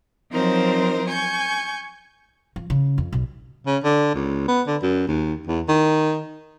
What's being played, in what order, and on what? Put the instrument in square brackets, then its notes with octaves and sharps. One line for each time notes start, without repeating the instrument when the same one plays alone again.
[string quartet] F3 F#3 C4 D#4 A#4 C5
G#5 C#6 G6
[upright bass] F3
C#3
F2
B1
[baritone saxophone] C#3
D3
C#2
B3
D3
F#2
D#2
E2
D#3